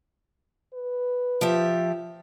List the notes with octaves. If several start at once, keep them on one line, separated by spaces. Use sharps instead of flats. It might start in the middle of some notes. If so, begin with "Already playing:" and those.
B4
F3 G4 E5